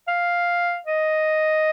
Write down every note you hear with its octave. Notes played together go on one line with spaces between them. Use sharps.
F5
D#5